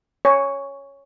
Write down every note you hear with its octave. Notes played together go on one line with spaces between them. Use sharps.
C#5 G#5